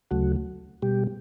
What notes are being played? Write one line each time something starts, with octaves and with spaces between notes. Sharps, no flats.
D2 C#3 F#3 A3 F#4
B2 G3 G4